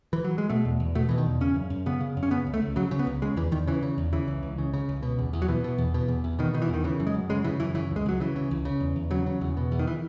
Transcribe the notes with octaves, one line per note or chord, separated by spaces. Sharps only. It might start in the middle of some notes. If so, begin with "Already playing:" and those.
E3
F#3
G#3
B2 A3
E2
E2
B2 A3
B2 E3
D#3
E2
C#3 C#4
F#2
F#2
C#3 B3
C#3
F#2
C#4
C#3 B3
C#2
A3
C#2
C#3 F#3
C#3
B3
C#2
C#3 G#3
E2 E3
E2 D#3
C#3 E3
C#3
E2
C#3 E3
C#2
C#2
C#3
C#3
C#2
B2
E2
E2
F#3
B2 E3
B2
E2
B2
E2
E2
B2 D#3
B2 D#3
E3
E2 D#3
C#3 E3
F#2
G#3
F#2
C#3 G#3
C#3 E3
F#2 E3
C#3 E3
C#2
G#3
C#2 F#3
C#3 E3
C#3
C#2
C#3
E2
E2
C#3 F#3
C#3
E2
B2
E2
D#3
E3